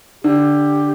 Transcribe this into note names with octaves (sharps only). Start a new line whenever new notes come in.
D3 G4